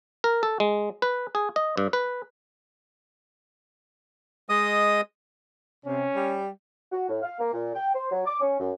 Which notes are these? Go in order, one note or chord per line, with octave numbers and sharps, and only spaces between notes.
A#4
A4
G#3
B4
G#4
D#5
G2
B4
G#3 D#5 D#6
C3 C#4
G3
F#4
A2
F5
A#3
A#2
G5
C5
F#3
D6
C#4
F#2